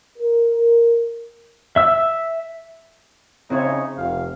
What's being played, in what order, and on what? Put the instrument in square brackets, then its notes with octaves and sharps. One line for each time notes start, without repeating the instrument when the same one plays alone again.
[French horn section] A#4
[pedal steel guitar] E5 E6
[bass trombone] C#3 [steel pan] C4 E4 C#5 [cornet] D#4
[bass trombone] F1 [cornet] F5